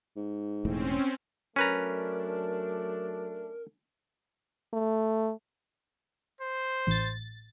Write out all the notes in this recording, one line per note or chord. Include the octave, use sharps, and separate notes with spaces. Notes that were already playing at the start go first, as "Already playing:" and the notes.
G#2
E1 A2 C4 C#4
F#3 A3 C#4 D4 A#4 B4 A#5
A3
C5
A1 A6